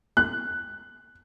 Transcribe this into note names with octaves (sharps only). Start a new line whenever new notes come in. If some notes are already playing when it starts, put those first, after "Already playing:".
F#6